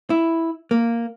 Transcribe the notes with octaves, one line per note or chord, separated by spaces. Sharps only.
E4
A#3